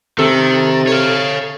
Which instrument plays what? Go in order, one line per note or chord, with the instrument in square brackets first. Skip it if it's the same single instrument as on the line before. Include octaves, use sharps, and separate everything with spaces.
[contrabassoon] C3 [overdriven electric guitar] D#3 [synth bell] A4
[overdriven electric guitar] C#5 F5